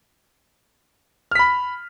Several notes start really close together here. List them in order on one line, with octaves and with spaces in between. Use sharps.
F6 B6 B5